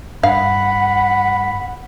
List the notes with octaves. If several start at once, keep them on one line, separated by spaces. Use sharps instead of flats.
G2 F5 F#5 B5